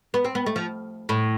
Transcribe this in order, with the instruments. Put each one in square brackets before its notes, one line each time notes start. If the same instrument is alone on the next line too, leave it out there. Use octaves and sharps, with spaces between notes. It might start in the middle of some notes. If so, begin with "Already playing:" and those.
[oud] B3
C4
B3
A3
F3
A2